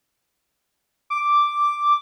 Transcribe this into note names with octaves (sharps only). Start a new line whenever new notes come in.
D6